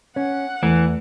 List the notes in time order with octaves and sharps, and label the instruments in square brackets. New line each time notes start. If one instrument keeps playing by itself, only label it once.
[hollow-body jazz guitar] C#4 [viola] F#5
[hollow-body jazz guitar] E2 [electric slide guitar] E3 [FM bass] A3